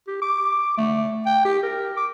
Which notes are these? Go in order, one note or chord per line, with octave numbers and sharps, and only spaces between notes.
G4
D6
A3
G5
G4
A#4
D6